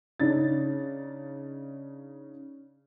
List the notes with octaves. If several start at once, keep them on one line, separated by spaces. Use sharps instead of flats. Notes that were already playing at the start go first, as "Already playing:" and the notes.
C#3 D4 D#4 A6